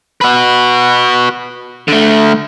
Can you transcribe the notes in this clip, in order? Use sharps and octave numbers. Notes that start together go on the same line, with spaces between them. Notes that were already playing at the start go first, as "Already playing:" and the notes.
F#4 B4
D3 A3